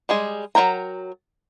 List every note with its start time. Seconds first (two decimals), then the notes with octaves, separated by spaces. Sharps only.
0.09 G3 G#3 G#4
0.55 F#3 E4 A#4 G5 A#5